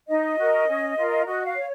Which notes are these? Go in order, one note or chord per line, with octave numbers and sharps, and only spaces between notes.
D#4 D#5
F#4 A#4
C#4
F4 A#4
F#4 D#5
F5
C#5